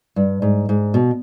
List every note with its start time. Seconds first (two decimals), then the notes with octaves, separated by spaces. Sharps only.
0.16 G2
0.42 G#2
0.69 G#2
0.94 B2